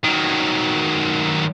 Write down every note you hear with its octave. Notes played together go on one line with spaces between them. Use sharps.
D#3 F#3